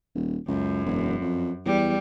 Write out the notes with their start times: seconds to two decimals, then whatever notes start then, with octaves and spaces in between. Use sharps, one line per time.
0.15 D#1
0.48 C#2 F#2
0.86 E1
1.22 F2
1.66 E2 G3